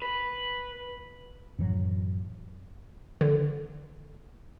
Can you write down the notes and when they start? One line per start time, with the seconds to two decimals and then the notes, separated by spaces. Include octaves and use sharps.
0.02 B4
1.59 F#2 A2 E3 F#3
3.21 D3